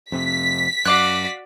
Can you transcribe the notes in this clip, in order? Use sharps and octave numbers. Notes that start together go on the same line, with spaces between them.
F2 C3 B6
F#2 F#4 D5 F5 D6 F#6